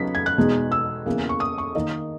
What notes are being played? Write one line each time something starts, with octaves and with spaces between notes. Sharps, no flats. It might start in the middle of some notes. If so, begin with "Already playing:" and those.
Already playing: C#3 F#3 B3 D#4 B6
G#6
F#6
E2 B2 G#3 D#4
E6
E2 C#3 E3 A#3
C#6
D#6
C#6
D#3 A#3 D#4 D#5